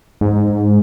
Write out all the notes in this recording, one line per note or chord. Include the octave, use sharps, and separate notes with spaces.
G#2